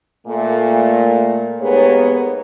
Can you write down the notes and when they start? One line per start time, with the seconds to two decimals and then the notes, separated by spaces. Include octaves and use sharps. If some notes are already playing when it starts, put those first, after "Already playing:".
0.27 A#2 A3 A#3
1.60 G#2 A#3 B3 G4 G#4 C#5